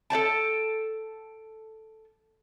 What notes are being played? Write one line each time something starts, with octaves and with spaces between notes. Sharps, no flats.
A4 D5 G5 A5